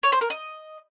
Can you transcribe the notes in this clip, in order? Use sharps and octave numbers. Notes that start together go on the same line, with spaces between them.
C#5
C5
A#4
D#5